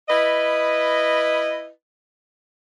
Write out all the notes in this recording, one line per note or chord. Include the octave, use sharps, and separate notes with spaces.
E4 B4 D#5